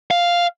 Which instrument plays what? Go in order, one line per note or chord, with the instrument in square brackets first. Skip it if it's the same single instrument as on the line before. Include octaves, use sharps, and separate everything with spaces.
[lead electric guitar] F5